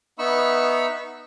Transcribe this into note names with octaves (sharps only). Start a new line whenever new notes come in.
B3 D#4 E5 B5 C#6 E6